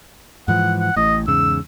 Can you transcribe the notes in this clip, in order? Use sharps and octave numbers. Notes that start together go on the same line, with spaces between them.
G#2 E3 F3 F#5
F#5
A1 A2 D#5
E2 G#2 C#3 E6